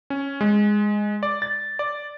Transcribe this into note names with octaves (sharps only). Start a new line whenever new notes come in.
C#4
G#3
D5
A6
D5